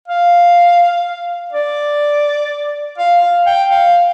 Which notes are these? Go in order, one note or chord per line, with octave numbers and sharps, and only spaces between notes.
F5
D5
F5
F5
G5
F5